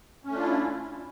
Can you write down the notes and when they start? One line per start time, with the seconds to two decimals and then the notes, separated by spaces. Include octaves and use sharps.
0.24 C#4
0.28 A3
0.33 D4
0.37 F4
0.42 E4